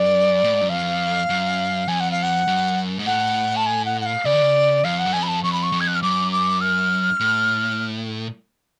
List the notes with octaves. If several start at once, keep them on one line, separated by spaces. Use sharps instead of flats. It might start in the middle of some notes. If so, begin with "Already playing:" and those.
Already playing: F#2 D5
A2
G#2
F#2
F2 F5
F#2
F2 G#5
F#5
F5
F#5
F#2
G#2
A2 F#5
A5
G#5
F#5
F#5
F5
C#3 D5
D3
C#3
F2 F5
F#5
F#2
F2 G#5
B5
A5
F2 C#6
B5
C#6
F2
G#6
F#6
F6
F#2 D6
D6
F6
A2